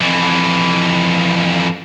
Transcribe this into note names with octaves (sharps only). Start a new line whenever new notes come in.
F2 E3